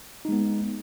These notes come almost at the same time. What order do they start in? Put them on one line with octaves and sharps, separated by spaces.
D#4 G#3 B3